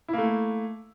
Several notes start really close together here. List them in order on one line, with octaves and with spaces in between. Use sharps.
E4 A#3 A3